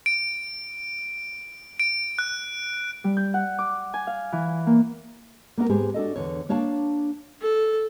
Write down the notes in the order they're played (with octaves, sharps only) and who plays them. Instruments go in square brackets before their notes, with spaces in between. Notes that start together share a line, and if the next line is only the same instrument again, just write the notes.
[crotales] D7
D7
F#6
[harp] G3
G6
F#5
D6
G#5
F5
E3
A#3
[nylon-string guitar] A#3 B3 E4 A#4
G#2 G#3 B3 G4 G#4
D4 F#4 A4 D#5
E2 D3 C#5
A#3 D4 C#5 F5 A5
[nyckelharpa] A4